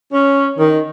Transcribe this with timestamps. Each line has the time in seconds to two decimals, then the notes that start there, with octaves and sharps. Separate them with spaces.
0.13 C#4
0.58 D#3